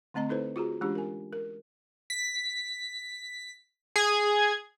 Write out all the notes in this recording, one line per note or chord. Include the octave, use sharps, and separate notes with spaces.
D3 A3 C4 D#5 A#5
D#4 E4 A4 B4 C5
F4 F#4 G#4 A#5
E3 G#3 C#4 D4 F4 G4
A#4 G#5
A#4
B6
G#4 G#6